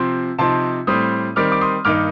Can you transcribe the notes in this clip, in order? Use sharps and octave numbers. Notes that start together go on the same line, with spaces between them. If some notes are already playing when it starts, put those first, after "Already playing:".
Already playing: C3 F3 C4 C6
C3 F3 C4 D#4 A5 C6
A2 G3 C4 C6 D#6
D#3 G3 C4 D6 F6
D6
C6 D#6
G2 D#3 A#3 D#4 D6 F6